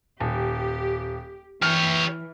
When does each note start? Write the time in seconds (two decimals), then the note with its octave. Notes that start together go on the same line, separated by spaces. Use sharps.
0.20 D#1 G4
1.62 E3 G4 C#5 F6